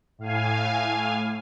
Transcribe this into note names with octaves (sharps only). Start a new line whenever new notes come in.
A2 F5 G#5